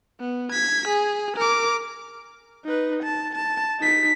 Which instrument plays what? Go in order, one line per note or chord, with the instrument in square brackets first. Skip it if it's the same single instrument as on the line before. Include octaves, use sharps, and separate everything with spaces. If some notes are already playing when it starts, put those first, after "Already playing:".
[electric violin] B3
G#6 B6
G#4
A#4 D6
D#4 B4
A5
A5
D#4 B6